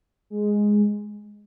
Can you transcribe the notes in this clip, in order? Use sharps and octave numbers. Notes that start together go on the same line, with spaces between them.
G#3